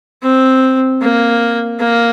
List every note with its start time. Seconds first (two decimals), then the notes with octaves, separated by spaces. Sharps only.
0.22 C4
1.02 A#3
1.79 A#3